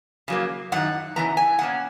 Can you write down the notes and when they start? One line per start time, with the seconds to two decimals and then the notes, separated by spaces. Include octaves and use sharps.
0.28 C#3 F#3 A#3
0.72 F#2 D#3 D#4 F#5
1.16 C#3 E3 B3 A#5
1.37 G#5
1.59 B2 A#3 C#4 F#5